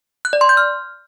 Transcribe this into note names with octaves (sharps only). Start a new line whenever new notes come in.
F#6
D5
C6
G6
F6